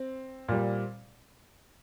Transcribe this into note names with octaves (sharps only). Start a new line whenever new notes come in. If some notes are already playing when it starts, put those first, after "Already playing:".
Already playing: C4
A#2 G3